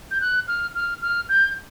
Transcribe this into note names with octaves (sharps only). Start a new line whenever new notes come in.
G6
F#6
F6
F6
F6
G6